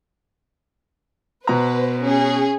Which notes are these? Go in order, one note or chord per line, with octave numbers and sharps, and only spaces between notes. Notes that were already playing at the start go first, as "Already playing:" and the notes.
B2 B4 C5 A#5
C#4 G#4